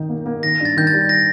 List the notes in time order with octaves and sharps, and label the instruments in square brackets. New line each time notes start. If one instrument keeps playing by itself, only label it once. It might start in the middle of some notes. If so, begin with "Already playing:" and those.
Already playing: [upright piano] D#3 D#4
A#3
A#3
[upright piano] D#3 [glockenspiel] A#6
[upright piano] G2
[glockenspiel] A6
[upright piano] D#3 [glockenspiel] G6
[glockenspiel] A6
[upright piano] G3
[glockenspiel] A#6